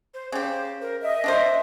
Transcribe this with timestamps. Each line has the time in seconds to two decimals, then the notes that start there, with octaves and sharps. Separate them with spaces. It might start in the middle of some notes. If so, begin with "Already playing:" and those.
0.14 C5
0.32 C#3 G4 C5
0.81 A#4
1.03 D#5 E5
1.24 D4 F4 C5 E5